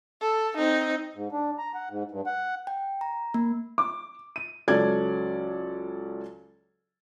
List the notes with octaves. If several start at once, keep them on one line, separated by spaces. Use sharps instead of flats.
A4
C4 D#4
G#2
D4
A#5
F#5
G#2
G2
F#5
G5
A#5
A#3
D6
D#7
C#2 F#3 C#4 A4 D5 G#6